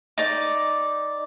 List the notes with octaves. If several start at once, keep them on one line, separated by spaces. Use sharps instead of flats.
D#4 D5